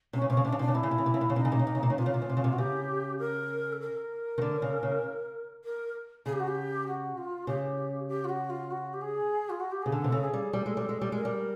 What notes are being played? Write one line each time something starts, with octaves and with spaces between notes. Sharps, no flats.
C3 C#4
C#3
C3 C#4
C#3
C3 D4
C#3
C3 D4
C#3
C3 E4
C#3
C3
C#3
C3
C#3
C3
C#3
C3 D#4
C#3
C3
C#3
C3
C#3
C3
C#3
C3 F4
C#3
C3
C#3
C3
C#3
C3
F#4
C#3 G4
A#4
A4
A#4
D#3
D3
C#3
C#3
A#4
C#3 G#4
G4
F#4
G4
F#4
F4
C#3 G4
G4
F4
F#4
F4
F#4
G4
G#4
F4
F#4
G4
C#3 G#4
D3 A4
C3
C#3
G#4
G3
G3 A4
G#3
G3
G#3
G3
G#3 A#4
G3